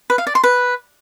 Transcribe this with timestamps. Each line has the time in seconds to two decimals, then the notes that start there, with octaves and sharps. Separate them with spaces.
0.10 B4
0.18 F5
0.27 D5
0.35 C6
0.44 B4